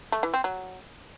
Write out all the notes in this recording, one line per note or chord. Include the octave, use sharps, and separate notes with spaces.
A3
E3
C4
F#3